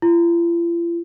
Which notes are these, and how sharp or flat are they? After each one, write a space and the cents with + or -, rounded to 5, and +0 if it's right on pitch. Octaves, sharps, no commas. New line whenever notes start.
F4 -45